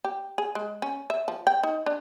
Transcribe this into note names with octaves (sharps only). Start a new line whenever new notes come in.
G4
G#4
G#3
C#4
E5
F3
G5
D#4
D4